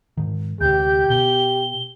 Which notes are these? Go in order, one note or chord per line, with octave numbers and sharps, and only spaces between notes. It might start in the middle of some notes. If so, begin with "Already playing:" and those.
G#2 D#3
D2 C3 G4 G6
B2 G7